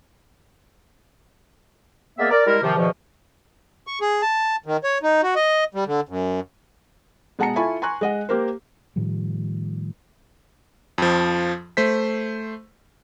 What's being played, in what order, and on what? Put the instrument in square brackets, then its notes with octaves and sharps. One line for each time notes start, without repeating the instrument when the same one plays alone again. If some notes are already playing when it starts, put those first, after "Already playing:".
[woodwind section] G#3 A#3 B3 A#4 D5 E5
A#4 D5
G3 G#3 E4 A#4
C3 D#3 F3
E2 B2 D#3 F3
[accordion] C#6
G#4
A5
D#3
C#5
D#4
F#4
D#5
G3
D3
F#2
[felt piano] B2 G#3 F#5 A5 A#5 C#7
E4 F4 A4 G#5 B5 C#6
G#5 A#5 C6 C#6 F#6
G#3 D#5 F#5
A#3 G4 A#4 C5
[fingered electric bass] A2 D#3 F3 G3
[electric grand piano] F2 F3
A3 C5 B6